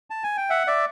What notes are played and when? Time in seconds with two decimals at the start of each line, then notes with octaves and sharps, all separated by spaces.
0.10 A5
0.24 G#5
0.37 G5
0.50 E5 F#5
0.67 D5 E5